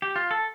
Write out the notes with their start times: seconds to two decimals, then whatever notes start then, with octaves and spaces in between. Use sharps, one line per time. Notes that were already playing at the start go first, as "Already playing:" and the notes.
0.02 G4
0.16 F4
0.31 A4